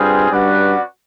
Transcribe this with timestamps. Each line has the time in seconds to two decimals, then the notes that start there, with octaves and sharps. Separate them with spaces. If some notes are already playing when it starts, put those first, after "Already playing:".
Already playing: G2 G3 C4 F4 G#4 B4
0.31 G2 C#4 F#4 B4 D5 F#5